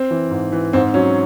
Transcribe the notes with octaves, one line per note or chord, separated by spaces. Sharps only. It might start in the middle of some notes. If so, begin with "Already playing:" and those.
Already playing: C4
E3
G#2
E3
G#2 C4
F#3 C#4